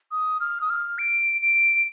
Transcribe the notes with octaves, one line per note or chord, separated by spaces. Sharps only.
D#6
F6
D#6
F6
D7
D7